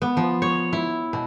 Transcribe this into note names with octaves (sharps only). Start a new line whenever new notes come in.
B3
F3
C#5
E4
B2